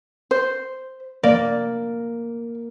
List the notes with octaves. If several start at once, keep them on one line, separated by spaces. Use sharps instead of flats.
C5
A#3 D5